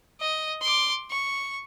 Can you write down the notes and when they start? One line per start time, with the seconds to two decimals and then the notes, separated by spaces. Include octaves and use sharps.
0.21 D#5
0.62 C6 D6
1.11 C#6